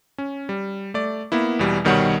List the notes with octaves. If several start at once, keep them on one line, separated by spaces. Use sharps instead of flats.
C#4
G3
A3 D5
A#3 B3 E4
E2 B2 E3 G3
C2 B2 D#3 G3 C#5 F#5